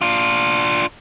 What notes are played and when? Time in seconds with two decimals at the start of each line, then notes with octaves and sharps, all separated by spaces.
0.02 D4 F4